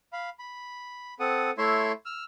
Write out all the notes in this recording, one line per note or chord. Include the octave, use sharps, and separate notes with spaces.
F5 B5
B5
C4 A4 F#5 D#6
A3 E4 C#5 E5 C6
E6 F6